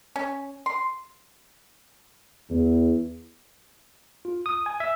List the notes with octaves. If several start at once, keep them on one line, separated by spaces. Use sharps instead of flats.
C#4
C6
E2
F4
D#6
G#5
E5